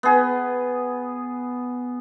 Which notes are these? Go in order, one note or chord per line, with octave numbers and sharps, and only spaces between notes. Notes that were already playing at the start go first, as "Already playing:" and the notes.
B3 G#4